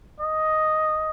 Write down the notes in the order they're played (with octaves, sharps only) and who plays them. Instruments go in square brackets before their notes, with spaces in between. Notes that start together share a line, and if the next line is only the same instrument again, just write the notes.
[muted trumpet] D#5